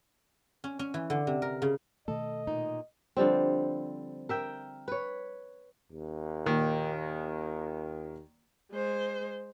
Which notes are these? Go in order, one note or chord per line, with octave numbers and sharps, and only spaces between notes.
C#4
C#4
E3
D3
C3
A#4
C#3
B2 D#3 A3 A4 D#5
A#2 D#4
D3 F3 G3 C4
A#4 E5 G5
B4 C#5
D#2
A#2 D#3
G#3 C5